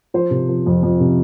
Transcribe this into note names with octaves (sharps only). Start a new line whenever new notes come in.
F3 C5
C3
F3
F2
F2
C3